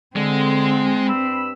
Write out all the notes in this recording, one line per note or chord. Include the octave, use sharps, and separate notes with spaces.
D3 G#3 C4
G2 B5 E6